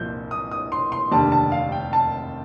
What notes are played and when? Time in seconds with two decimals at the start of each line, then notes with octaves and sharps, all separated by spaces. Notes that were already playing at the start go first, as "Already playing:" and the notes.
Already playing: C2 A#2 F3 G6
0.31 D#6
0.51 D#6
0.72 C6
0.92 C6
1.11 F1 D#2 D3 G3 A5
1.32 A5
1.52 F5
1.72 G5
1.93 A5